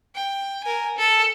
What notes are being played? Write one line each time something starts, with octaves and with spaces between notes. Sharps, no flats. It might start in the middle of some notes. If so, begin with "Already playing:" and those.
G5
A#4 G#5
A4